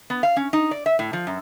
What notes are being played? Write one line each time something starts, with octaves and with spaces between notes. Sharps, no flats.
B3
F5
C#4
D#4
D5
E5
A2
F3
F#2